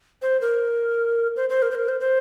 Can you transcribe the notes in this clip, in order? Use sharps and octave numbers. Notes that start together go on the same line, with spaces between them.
C5
A#4
C5
C5
A#4
C5
A#4
C5
C5